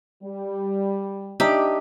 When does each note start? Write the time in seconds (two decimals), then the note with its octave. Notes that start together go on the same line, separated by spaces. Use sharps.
0.22 G3
1.40 D4 D#4 G4 E5